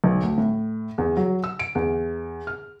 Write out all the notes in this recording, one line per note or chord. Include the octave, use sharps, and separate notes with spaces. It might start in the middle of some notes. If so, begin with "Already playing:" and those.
B1
D2
A2
E2
F#3
E6
D7
E2
F6